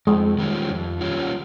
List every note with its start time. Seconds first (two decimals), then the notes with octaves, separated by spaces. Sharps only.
0.07 F2 G#3
0.38 D#3 G3 C#4 F4
0.70 F2
1.01 D#3 G3 C#4 F4